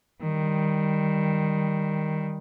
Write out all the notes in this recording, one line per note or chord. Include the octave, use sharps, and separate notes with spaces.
D#3 G3